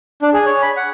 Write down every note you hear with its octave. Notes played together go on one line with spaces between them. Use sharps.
D4
G#4
C#5
B5
F#5